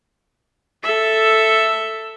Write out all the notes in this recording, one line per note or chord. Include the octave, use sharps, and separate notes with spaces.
A4 E5